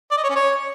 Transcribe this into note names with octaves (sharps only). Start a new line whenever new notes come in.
D5
D#5
C#5
C#4
C#5